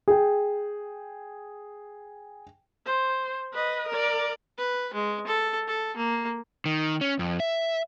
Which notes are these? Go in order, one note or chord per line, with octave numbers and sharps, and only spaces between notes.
G#4 G5
C5
B4 D#5
A#4 D5
B4
G#3
A4
A4
A#3
D#3
C#4
F2
E5